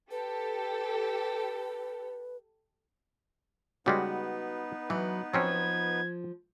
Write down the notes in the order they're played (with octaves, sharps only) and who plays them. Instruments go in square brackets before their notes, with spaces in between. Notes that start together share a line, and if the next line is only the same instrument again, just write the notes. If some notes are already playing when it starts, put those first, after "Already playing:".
[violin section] G4 A4 [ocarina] B4
[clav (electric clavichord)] C#3 G3 G#3 [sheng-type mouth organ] B3 D#4 B4 [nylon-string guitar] F#4
[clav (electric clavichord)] E3 [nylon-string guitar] F#3
[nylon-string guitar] F3 [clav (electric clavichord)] F#3 C4 C#4 [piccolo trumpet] G#6